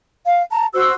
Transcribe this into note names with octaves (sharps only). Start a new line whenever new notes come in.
F5
A5 A#5
F#4 C5 E6